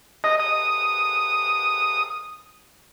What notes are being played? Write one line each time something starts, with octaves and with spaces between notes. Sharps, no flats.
D#5
D#6